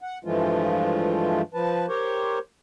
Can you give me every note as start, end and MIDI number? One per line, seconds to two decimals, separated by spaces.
0.01 0.18 78
0.24 1.41 43
0.24 1.41 52
0.24 1.41 53
0.24 1.41 56
0.24 1.41 57
0.24 1.41 65
1.54 1.86 53
1.54 1.86 71
1.54 1.86 81
1.88 2.39 67
1.88 2.39 70
1.88 2.39 72
1.88 2.39 73